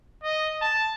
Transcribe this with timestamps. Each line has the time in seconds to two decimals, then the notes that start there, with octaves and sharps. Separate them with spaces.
0.23 D#5
0.62 A5